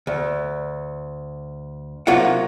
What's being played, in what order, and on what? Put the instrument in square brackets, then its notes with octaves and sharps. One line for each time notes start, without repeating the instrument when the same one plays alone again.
[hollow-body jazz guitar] D2
C3 F#3 A#3 F4 F#5